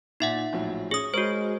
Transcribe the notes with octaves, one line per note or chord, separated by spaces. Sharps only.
A#2 D#4 E5 F#5
A#1 A2 F#3
C#4 G#4 D#6
G#3 F#4 A#4 C5 C#5